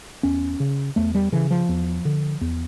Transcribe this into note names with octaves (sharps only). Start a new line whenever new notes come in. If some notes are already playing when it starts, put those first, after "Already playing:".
E2 C#4
C#3
E2 A3
G3
C#3 E3
F3
E2
D3
E2